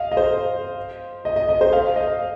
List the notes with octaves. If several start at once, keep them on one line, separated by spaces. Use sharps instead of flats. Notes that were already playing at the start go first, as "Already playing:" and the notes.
Already playing: D#5 F5
D#5
C5
D#5
D#5
D#5
C5
F5
D#5